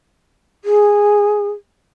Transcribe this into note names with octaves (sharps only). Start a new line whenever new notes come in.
G#4